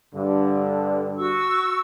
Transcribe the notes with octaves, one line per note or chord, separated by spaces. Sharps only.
G2 D3
F#4 C#6 E6